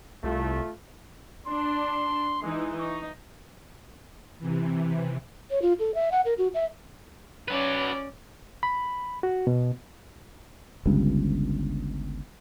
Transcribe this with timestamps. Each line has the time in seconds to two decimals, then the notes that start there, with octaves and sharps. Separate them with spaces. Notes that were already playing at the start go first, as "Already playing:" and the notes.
0.24 C2 A3 F4
1.47 D4 C6
2.42 E3 G#3 D#4
2.79 D#4 C#6
4.39 C3 E3
5.50 C#5
5.62 F4
5.79 A4
5.95 E5
6.12 F#5
6.25 A#4
6.38 F#4
6.54 E5
7.48 F#3 C#4 B4 D5
8.63 B5
9.23 F#4
9.47 B2
10.86 G1 C#2 G2